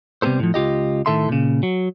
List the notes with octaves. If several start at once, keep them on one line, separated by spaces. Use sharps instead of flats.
C3 G3 B3 C4 A4 C5
A2 F3
C#2 F4 G4 D#5
A2 D#3 A3 A4 E5 C6
A#2 C#3
F#3